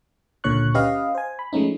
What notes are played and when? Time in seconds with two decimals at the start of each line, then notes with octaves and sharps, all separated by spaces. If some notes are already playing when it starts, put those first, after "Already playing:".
0.44 C#2 A#2 D3 C#5 C#6 F#6
0.74 C#4 G4 B4 D#5 F5
1.15 C5 G#5
1.39 B5
1.53 F3 G#3 A3 C#4 D#4